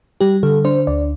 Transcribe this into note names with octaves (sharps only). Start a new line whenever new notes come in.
G3 G4
D3 A4
D4 C5
D2 D5